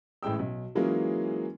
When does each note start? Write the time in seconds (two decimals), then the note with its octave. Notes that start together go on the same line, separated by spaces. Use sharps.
0.23 A1 A2 G#3 G5 E6
0.39 B1
0.75 E3 F#3 G#3 A#3 C#4 F4